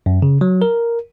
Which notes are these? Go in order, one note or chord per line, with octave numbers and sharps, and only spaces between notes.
F#2
C#3
F#3
A#4